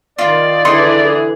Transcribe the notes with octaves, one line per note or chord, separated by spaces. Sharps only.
D#3 F4 D5
D3 E3 D#4 G#4 C6